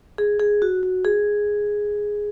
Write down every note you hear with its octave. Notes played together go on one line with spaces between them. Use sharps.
G#4
G#4
F#4
F#4
G#4